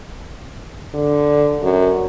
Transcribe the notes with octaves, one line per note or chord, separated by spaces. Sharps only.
D3
F#2